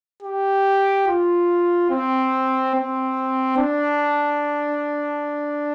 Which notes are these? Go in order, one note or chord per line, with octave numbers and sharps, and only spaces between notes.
G4
F4
C4
C4
D4